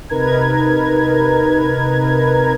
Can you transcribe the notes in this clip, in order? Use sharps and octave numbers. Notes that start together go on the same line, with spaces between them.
C3 D#4 A#4 B4 A#5 G#6